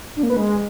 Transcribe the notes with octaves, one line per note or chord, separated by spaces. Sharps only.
D4
A#3
B4
G#3